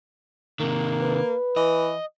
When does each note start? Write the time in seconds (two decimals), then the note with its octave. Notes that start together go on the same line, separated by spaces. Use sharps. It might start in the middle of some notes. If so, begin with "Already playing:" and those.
0.60 C3 D#3 A#3
1.02 B4
1.56 E3 D#5